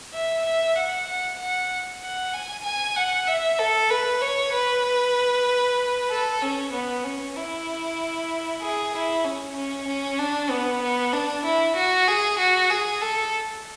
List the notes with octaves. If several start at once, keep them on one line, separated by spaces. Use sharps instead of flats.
E5
E5
F#5
F#5
F#5
F#5
G#5
G#5
F#5
E5
A4
B4
C#5
B4
A4
C#4
B3
C#4
E4
G#4
E4
C#4
C#4
C#4
D4
B3
B3
D4
E4
F#4
G#4
F#4
G#4
A4